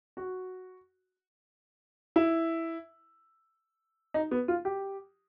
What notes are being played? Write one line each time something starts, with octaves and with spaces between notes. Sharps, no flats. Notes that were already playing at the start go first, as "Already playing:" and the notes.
F#4
E4
D#4
B3
F4
G4